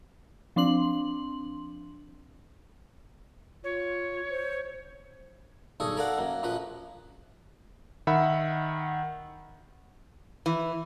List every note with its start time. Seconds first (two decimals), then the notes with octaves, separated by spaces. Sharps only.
0.56 F3 C4 D4 C6 F#7
3.64 F4 C#5
4.30 C5
5.80 B1 G2 G#4 A4 C#6
5.97 A4 A#4 D5 F5 F#5
6.18 F#2 A#3
6.43 A#1 F3 A#3 B4
8.07 D#3 E5 F#5 B5
10.46 E3